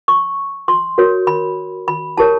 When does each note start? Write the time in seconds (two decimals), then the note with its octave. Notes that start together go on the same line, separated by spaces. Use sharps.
0.08 C#6
0.68 C6
0.98 F#4 A#4 C#5
1.27 B5
1.88 B5
2.17 E4 G4 A#4 C#5 A5